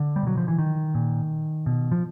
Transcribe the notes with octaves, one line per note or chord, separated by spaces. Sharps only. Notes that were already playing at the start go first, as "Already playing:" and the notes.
Already playing: D3
G3
B2 F#3
F3
E3
D#3
A#2
B2
F3